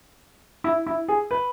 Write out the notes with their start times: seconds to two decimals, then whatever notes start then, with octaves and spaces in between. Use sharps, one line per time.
0.64 E4
0.87 E4
1.08 G#4
1.31 B4